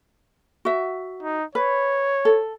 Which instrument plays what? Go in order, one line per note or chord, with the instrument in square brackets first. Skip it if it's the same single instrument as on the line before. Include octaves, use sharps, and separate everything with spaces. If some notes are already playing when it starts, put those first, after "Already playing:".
[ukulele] F#4 E5
[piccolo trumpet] D#4
[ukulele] B4 [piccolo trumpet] C#5
[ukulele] A4